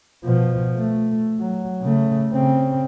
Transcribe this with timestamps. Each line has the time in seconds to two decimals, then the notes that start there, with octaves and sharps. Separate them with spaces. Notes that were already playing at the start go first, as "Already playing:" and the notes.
0.25 B2 F3
0.75 A3
1.39 F#3
1.82 C#3 A3
2.33 C#3 C4